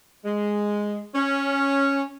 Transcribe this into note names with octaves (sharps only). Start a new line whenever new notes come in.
G#3
C#4